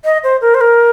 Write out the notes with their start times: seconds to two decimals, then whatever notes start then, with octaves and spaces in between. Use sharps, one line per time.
0.05 D#5
0.23 C5
0.41 A#4
0.54 C5
0.61 A#4